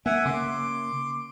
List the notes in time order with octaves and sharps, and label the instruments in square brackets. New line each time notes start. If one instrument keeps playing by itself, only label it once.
[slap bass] A#3 [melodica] E5 F#5 G#5
[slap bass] C#3 A#3 [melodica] C6 D6